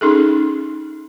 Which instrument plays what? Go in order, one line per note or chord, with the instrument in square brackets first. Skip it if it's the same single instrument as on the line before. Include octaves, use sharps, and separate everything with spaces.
[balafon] C#4 D#4 G#4 A4